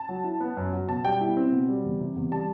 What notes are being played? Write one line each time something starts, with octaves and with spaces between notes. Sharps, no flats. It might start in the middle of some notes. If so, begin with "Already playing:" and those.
Already playing: A5
F#3
E4
B3
F#2
F#3
B2 A5
G3 G5
E4
C4
B2
G3
E2
C3
E2
G3 A5